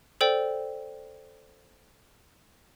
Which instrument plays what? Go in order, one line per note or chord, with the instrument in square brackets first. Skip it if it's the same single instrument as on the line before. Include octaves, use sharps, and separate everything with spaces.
[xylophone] A4 C5 D5 G5